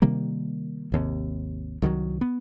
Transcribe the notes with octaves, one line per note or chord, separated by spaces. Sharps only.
C3 D#3 G3 A#3
G#1 D#2 C3
C2 D#3 F3 F#3
B3